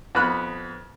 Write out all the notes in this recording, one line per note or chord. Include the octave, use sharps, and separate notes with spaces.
F2 B3 B5 F#6